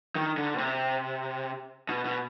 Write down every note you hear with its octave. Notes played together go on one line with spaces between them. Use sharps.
D#3
D3
B2
C3
B2
B2